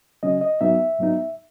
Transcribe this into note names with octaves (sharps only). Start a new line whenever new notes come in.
C#3 F#3 C#4 D#5
D#5
G#2 F#3 B3 D#4 E5
G#2 F#3 B3 D#4